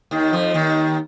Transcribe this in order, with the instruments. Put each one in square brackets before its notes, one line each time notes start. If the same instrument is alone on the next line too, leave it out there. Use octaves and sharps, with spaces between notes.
[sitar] D#2 D#3
F2 F3
D#2 D#3